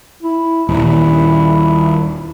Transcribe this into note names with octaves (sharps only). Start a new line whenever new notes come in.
E4
D#1 E4